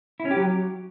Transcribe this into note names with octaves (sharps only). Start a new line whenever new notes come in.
E4
C#4
G4
F#3